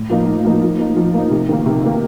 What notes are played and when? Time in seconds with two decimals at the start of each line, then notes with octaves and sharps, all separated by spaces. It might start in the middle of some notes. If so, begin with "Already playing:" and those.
Already playing: A2
0.10 F3 A#3 D#4
0.27 A2
0.45 F3 A#3 D#4
0.62 F3
0.79 A#3 D#4
0.97 F3
1.14 A#3 D#4
1.31 C3
1.49 D#3 A#3
1.66 C3
1.84 D#3 A#3